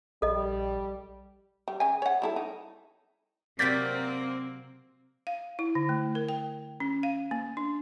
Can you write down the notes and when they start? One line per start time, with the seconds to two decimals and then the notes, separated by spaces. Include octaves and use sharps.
0.22 A#1 G3 A4 D#5
1.68 G3
1.80 C#3 G#5
2.02 C#5 F#5
2.22 G3 E4 A4
2.36 D#4
3.59 C3 F#3 A#3 C4 D5 G6 A6 B6
5.27 F5
5.59 E4
5.75 D3
5.89 A3
6.15 A#4
6.29 G5
6.80 C#4
7.03 F5
7.31 A#3
7.57 D4